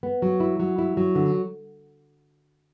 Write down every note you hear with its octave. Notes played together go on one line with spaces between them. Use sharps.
B3
F#3
E4
F#3
E4
F#3
D3